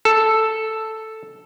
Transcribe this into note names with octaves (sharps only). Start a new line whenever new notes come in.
A4